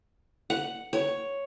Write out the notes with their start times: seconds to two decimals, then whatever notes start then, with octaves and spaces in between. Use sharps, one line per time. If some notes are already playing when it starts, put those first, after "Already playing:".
0.50 F#5
0.93 C#5